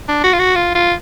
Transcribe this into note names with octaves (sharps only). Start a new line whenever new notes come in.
D4
F#4
F4
F#4
F4
F4